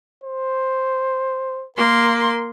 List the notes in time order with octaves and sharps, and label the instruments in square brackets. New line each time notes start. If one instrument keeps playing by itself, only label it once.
[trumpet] C5
[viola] A#3 C6 [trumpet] A#4